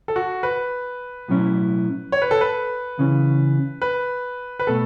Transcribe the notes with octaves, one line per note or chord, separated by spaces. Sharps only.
A4
F#4
B4
B1 A2 F#3 C#4 E4
C#5
B4
A4
B4
C#2 C#3 E3 C#4
B4
B4
B2 A3 A4